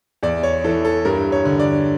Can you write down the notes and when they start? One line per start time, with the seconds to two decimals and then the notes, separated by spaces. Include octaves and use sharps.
0.23 E2 D5
0.43 C#5
0.64 E3 A4
0.85 A4
1.05 G2 A#4
1.32 C#5
1.45 D3
1.60 D5